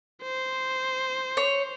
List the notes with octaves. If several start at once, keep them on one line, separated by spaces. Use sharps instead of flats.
C5
C#5